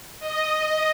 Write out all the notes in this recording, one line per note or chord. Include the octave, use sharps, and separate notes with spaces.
D#5